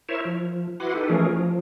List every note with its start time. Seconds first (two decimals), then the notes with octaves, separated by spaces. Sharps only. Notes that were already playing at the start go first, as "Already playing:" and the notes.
0.09 E4 A#4 C5 C#5 E5
0.25 F3
0.80 E4 F#4 B4 F#5 C6 D6
0.95 D#4 G4 A4 B4
1.10 E3 F3 A3 C#4 G#4 A#4
1.33 F3